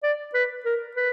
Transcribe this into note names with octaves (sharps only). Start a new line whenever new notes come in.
D5
B4
A#4
B4